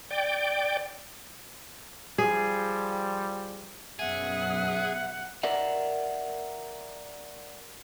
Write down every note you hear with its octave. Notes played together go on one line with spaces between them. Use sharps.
D5 G5
F3 G3 G#4
F#2 B2 G#4 E5 F#5
A#4 D5 E5 F#5